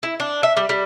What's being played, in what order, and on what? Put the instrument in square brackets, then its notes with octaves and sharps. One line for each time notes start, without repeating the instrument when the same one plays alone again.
[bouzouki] E4
D4
E5
G3
G3